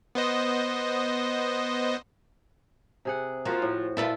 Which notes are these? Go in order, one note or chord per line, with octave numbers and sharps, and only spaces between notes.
B3 C5 D#5
C3 G#4 F#5
F3 A#3 F#4
A2
A#2 E4 F4 A4 B4